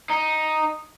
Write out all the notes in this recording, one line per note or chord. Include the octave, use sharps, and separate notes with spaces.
D#4